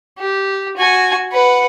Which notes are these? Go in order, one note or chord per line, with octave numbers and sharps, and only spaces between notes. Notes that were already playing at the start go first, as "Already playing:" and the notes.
G4
F#4 G#5
B4 F#5